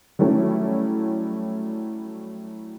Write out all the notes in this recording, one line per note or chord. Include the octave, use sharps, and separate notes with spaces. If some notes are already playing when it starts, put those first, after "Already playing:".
F#3 G3 A3 C#4 E4